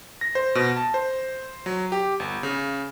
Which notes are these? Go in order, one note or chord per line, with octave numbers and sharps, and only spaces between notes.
A#6
C5
B2
A5
C5
F#3
G4
G1
C#3